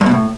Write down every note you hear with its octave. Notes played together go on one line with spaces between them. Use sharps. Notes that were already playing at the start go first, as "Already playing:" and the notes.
G2
B2
A2